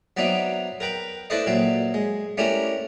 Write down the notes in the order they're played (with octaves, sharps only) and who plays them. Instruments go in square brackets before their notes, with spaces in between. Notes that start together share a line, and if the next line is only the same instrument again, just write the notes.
[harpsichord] F#3 B3 C4 D4 D#4 E5
A#4 B4 G5 B5
D4 E4 A4 B4 C5 D#5
A#2 F#3 C4 E5
G#3
A3 C#4 D4 E4 G4 A#4